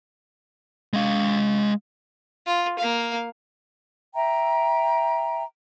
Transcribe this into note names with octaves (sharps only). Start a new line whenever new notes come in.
G#3 F5
F4
A#3 F5
E5 G5 A#5